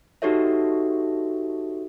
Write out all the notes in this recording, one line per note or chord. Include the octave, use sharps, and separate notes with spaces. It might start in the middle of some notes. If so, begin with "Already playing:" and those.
D#4 F#4 G4 A4 C#5 E5